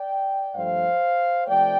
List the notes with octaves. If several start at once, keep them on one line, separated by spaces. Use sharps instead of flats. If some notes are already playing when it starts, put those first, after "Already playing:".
Already playing: D5 G5
G2 F3 A3 C5 F5
C3 F3 A3 D5 G5